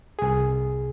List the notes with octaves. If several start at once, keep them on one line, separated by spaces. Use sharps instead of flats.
C2 G#4